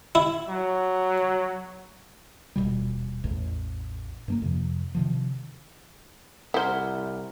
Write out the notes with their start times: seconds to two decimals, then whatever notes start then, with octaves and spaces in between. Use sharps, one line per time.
0.15 E4
0.48 F#3
2.56 D#1 A#1 B2 G3
3.24 A1 E2
4.28 G2 A3 A#3
4.42 F2 C3 F3
4.95 C3 D#3 F3
6.54 C2 E4 C5 E5 F#5 A#5 F6